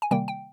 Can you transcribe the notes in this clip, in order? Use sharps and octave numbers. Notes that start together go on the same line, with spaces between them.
G#5
C3 D#3 G3 A#3 G5
G5